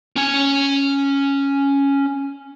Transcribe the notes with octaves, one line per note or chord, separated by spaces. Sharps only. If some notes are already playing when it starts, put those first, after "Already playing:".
C#4 G#5